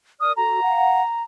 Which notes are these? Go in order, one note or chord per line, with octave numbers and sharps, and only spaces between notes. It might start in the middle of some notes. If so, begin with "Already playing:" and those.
A#4 D5 D#6 F6
F#4 A4 A#5
F5 F#5